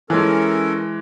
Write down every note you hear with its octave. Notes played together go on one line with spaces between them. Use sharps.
E3 G#3 C#4 A4 A#4